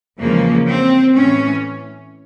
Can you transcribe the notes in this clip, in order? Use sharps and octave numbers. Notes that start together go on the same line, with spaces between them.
E2 C#3 F3 G#3 A#3
C4
A2 E3 A3 C#4